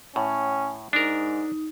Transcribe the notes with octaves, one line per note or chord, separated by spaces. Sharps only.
A2 C#4
G#2 D4 D#4 A#4